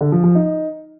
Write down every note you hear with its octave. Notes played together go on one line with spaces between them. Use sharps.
D3
F3
F3
D#4